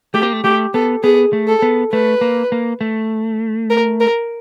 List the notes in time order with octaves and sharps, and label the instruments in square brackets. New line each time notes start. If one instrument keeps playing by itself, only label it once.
[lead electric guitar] A3 [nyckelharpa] G4
[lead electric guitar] A#3
A3
[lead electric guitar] A3 [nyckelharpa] G4
[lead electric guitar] B3 [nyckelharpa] A4
[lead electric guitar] B3 [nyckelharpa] G#4
[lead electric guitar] A3
[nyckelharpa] A4
[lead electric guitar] B3
[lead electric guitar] A3 [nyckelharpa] B4
[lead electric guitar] A#3
A#3
A3
[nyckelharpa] A#4
A#4